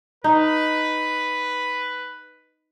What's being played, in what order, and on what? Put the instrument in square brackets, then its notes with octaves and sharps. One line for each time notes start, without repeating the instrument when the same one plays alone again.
[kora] D#4 [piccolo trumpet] B4